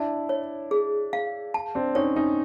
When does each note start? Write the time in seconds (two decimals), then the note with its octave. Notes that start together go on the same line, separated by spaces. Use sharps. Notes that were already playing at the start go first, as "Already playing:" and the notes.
Already playing: D4 E4 A5
0.29 C#5
0.71 G#4
1.13 F5
1.54 A5
1.75 C4 D4
1.95 C#4 D#4 C#5
2.16 C#4 D#4